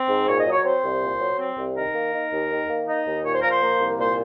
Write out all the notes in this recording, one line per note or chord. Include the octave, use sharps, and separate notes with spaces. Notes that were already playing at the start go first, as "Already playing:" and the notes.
Already playing: C4
G#2
A#2 C#5
D#5
F#3
C#5
C4 C5
C2
A#2
F#3
C4
C2
D#3 A#4
A#3
D#4
D#2
D#3
A#3
D#4
D#2
A#2 C#5
C5
F3 A#4
C5
A#3
C2
A#2 C5